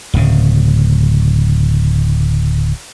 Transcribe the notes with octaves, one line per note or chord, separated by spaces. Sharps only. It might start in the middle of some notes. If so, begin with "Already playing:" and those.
D1 C#3